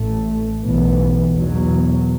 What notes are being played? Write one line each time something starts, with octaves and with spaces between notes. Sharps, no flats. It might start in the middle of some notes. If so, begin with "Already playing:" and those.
Already playing: A1 A2 A3
B1 A2 E3 B3
E2 B2 F#3